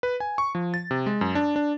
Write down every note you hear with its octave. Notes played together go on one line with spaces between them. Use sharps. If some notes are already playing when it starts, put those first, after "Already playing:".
B4
G#5
C#6
F3
A6
C3
G#3
F#2
D4
D4